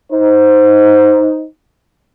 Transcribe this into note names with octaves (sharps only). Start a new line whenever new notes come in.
D#4 C5